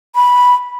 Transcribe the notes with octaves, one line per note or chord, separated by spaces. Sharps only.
B5